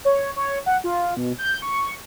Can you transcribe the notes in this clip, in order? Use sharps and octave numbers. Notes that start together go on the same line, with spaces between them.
C#5
C#5
F#5
F4
B2
G6
C#6